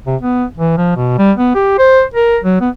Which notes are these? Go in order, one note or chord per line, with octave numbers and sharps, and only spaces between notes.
C3
B3
E3
F3
B2
G3
B3
G4
C5
A#4
F#3
B3